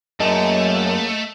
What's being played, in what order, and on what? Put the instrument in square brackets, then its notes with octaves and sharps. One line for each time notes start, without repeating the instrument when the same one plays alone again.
[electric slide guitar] F#2 [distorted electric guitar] A3 [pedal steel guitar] A#3 G#4 A4 [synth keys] D#5